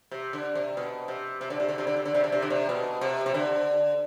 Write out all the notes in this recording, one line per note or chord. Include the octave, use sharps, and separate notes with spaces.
C3
D3
C3
B2
C3
C3
D3
C3
D3
C3
D3
C3
D3
C3
D3
C3
D3
C3
B2
C3
C3
D3